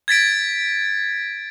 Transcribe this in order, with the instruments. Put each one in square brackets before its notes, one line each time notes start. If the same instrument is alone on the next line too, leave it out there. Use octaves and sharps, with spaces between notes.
[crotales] G#6 A6 B6 D7